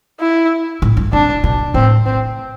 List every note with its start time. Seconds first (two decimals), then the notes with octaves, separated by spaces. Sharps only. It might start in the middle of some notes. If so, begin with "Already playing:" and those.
0.20 E4
0.82 A2
0.97 G2
1.13 C3 D4
1.44 B2
1.74 A2 C4
2.06 C4